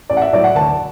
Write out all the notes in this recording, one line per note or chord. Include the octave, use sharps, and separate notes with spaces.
A1 D5
F#5
E5
A2 F#3 D5
F#5
D2 A5